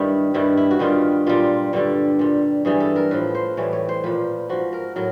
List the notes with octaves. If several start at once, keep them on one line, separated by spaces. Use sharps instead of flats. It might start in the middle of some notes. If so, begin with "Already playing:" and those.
Already playing: G2 D#3 G3 E4
G2 D#3 G3 E4
E4
F#4
G2 D#3 G3 F4
A#2 G3 F4
G2 D3 G3
A#2 G3
G2 E3 G3 G#4
A4
A#4
A2 F3 B4
C5
A2 E3 G3 C#5
C#5
C5
A#2 F3 B4
G#2 F3 F#4
A#4
A2 F#3 A#4